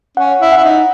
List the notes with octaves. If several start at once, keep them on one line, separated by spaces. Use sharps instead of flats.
C#4 F#5
E4
E4 F#5
D#4